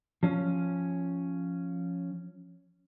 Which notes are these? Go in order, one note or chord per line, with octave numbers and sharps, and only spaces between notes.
F3 C#4